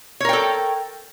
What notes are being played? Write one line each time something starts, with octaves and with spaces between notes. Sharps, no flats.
A4 A#4 C#5 G5